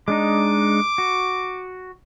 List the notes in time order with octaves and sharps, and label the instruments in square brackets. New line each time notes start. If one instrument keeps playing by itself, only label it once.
[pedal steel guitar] G#3 D4 D#4 [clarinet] D6
[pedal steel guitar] F#4